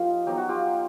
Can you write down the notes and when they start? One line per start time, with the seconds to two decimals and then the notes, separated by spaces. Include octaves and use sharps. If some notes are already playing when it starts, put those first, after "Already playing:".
Already playing: F3 A#3 D#4 F4 G4
0.27 F#3 B3 D#4 G4
0.37 F#4
0.49 F4 G4